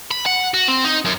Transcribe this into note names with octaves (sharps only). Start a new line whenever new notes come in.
B5
F#5
F#4
C4
D#4
F#2